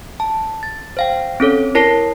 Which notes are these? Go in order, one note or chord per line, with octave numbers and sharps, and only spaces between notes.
A5
A6
C5 F5 G5
C4 C#4 A4 C#5
E4 A#4 C#5 A5 A#6 C7